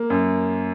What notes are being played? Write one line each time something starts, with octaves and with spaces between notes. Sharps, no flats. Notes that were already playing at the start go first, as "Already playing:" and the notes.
Already playing: A#3
F#2